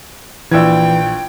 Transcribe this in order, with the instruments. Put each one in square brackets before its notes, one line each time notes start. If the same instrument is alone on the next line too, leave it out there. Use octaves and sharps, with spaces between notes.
[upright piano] A#1 E6 G#6 [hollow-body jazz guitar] E3 [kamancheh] G5